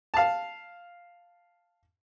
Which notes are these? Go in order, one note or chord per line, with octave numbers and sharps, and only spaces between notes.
F5 A5